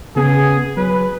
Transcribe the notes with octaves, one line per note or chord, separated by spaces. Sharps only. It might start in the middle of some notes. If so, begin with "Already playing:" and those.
C#3 B3 G#4
F#3 B4